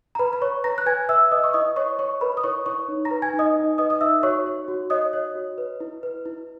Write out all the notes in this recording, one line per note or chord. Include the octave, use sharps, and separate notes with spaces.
A#5
B4 B5
B5
B4 C#5 C#6
B4 A#5 A#6
F#6
B4 G#5 G#6
B4 E5 E6
B4 D#5 D#6
C#6
E4 D#5 D#6
C#5 C#6
C#5 C#6
A#4 B4 B5
D#6
E4 C#5 C#6
E4 C#5 C#6
D#4
A#5 A#6
B4
G#5 G#6
D#4
D#5 D#6
D#4
B4 D#5 D#6
D#6
D#4 E5 E6
F#4 C#5 C#6
C#5
F#4
C#5 D#5 D#6
C#5
F#4
B4
E4
B4
E4